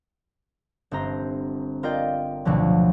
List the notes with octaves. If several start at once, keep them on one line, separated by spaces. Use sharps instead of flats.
G1 C4 C5 A#5
F4 A#4 D5 D#5 G5
A1 D2 B2 D3 F3 F#3